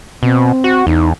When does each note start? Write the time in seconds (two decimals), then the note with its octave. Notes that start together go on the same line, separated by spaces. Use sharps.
0.23 B2 C4
0.64 F#4
0.87 E2 D#4